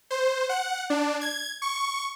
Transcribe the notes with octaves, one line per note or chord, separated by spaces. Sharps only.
C5
F#5
D4
G#6
C#6